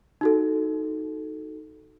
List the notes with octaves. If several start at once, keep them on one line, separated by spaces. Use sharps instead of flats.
D#4 F#4 A4